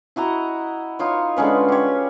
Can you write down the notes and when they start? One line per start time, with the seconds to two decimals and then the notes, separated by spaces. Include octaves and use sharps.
0.16 E4 F#4 D#5 A#5
0.99 D#4 F4 C#5
1.36 D3 G#3 C#4 B4
1.68 G4 C#5